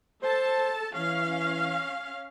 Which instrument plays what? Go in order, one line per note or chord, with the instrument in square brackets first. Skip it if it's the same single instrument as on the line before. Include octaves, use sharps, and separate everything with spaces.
[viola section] A4 A5 [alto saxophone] C5
[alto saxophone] E3 [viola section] C#4 F5